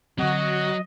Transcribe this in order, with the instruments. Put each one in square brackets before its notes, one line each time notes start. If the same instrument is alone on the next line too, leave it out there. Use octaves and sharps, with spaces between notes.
[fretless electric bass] D3 C4 [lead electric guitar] F#3 [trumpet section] F#4 [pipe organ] D#5